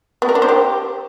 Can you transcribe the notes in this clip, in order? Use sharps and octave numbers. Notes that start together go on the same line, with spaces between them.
B3
A#4
D4
C5
G4